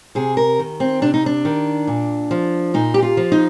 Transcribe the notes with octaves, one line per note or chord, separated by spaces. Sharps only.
C3 G#4
A#4
D#3
C4
C3 D4
D#4
D4
D#3
A#2
F3
A#2 D#4
G4
F4
F3
D#4